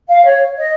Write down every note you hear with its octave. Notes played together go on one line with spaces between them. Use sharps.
F5
C#5
D#5